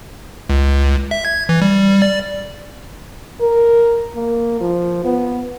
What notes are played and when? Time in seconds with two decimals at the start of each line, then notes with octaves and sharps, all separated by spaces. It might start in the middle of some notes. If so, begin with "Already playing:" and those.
0.50 C#2
1.11 E5
1.25 G#6
1.49 E3
1.62 G3
2.02 D5
3.41 A#4
4.15 A#3
4.61 F3
5.04 B3